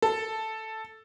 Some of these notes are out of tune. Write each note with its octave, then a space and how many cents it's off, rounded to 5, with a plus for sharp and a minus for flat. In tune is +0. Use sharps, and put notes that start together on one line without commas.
A4 +0